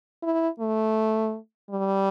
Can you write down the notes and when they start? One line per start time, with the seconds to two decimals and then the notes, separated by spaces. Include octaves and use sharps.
0.23 E4
0.60 A3
1.70 G3